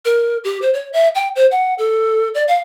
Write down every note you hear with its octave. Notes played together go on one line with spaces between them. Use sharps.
A#4
G4
C5
C#5
E5
G5
C5
F#5
A4
D5
F5